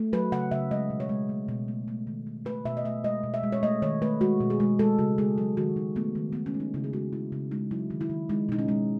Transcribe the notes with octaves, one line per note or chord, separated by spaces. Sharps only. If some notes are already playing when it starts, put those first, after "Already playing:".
Already playing: A3
F#3 B4
C#3 F#5
C#3 E5
G#3 D#5
B2
C#5
G#3
A3
B2
A3
A3
D#3
A3
A3 B4
B2 E5
D#5
A3 E5
G#3 D#5
B2
E5
G#3
C#5
A3 D#5
D#3 C#5
A3 B4
G#3 F#4
B2
G#4
G#3
G#3 A4
C#3 F#4
G#3 G#4
F#3 A4
D#3 F#4
D#3 D#4
A3 B3
D#3
A3 B3
C#4
G#3
D#4
C#3 E4
G#4
G#3 F#4
G#3 E4
C#3
G#3 D#4
F#3 E4
D#3
E4
D#3
G#3 D#4
B2 D#4
C#4
G#3